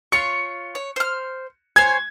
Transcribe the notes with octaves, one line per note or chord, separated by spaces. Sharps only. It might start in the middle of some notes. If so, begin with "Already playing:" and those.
F4 C#5 C#6 C#7
C#5
C5 F6
C5 C#5 G#5 G#6